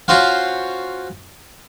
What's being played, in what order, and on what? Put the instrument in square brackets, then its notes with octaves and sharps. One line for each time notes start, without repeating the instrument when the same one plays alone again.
[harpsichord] C#4 F4 F#4 C5 F5